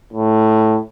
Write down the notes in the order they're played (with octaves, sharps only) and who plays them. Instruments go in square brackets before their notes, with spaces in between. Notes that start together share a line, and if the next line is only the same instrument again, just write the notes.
[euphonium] A2